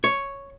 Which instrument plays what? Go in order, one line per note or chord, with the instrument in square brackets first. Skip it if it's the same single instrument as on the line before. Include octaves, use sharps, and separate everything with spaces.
[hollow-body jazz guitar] C#5